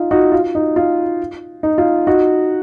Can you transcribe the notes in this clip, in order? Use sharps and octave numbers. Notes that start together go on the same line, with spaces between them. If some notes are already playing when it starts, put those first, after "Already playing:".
Already playing: D#4 F4
D#4 F#4
F4
D#4
F4
D#4
F4
D#4 F#4